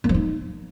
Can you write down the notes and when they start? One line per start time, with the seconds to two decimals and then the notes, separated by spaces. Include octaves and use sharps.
0.04 A#3
0.09 F3
0.14 D#4